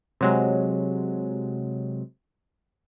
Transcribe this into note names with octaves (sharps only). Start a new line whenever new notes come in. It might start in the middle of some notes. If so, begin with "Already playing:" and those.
C3 F#3 G#3